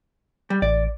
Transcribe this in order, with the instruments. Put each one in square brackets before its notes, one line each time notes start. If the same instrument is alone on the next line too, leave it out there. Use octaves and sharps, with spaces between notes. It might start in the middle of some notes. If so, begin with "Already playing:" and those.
[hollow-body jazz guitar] G3
[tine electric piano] A1 [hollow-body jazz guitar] D5